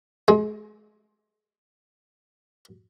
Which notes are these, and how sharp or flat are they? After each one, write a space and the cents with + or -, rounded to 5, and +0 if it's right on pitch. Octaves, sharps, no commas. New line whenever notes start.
G#3 +35